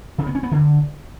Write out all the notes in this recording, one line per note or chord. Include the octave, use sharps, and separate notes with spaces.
C#3
B3
C#4
B3
D3